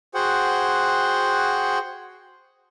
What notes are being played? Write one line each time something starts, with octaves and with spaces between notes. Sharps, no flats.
F#4 G#4 C5 F#5 G5